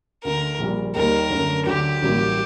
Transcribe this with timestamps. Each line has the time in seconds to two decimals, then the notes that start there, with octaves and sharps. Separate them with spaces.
0.25 D2 D3 A3 A#4
0.59 A#1 A#2 G3
0.95 D#2 D#3 G3 A#3 A#4
1.30 F#2 D3 A3
1.66 D2 D3 F#3 G4
2.02 A1 G2 F#3 A#3 F#4